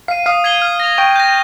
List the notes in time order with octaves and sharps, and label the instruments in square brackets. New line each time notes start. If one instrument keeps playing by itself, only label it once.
[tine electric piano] F5 [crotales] C7 D#7
[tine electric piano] F5 [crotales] D#6
[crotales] G#6 C7 D#7 G7
F6
A#6 F7
[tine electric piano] G5 [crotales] C#6
[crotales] G6 A#6